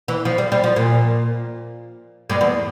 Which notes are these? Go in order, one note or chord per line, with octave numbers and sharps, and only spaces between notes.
E3
F3
G3
G3
F3
A#2
G2
E2